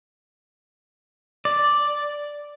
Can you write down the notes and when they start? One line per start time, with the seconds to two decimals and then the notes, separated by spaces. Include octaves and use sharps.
1.45 D5